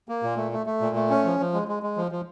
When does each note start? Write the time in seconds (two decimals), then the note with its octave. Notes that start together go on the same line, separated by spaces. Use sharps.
0.09 A#3
0.23 A#2
0.37 A3
0.52 A3
0.66 A3
0.81 A#2
0.96 A3
1.10 C#4
1.25 F3
1.39 F3
1.54 G#3
1.68 G#3
1.83 G#3
1.97 F3
2.12 F3